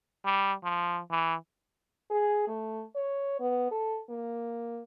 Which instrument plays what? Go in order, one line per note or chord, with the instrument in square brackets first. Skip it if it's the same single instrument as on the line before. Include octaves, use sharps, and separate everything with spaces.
[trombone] G3
F3
E3
[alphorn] G#4
A3
C#5
B3
A4
A#3